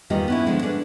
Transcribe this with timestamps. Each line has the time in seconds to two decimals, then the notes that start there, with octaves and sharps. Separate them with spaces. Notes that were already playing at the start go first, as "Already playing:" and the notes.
0.10 E2 D#3 G3 A#3 F4 D#5
0.28 B3 C#4 E4
0.46 D3 F3 G#3 A3
0.62 C#4 D4 B4